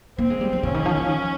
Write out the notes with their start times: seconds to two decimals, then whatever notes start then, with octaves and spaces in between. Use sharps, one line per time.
0.18 A#3 C4
0.30 G#3
0.41 G3
0.53 F3
0.63 C#3 C#4
0.74 D#3
0.85 F3
0.97 F3
1.08 D#3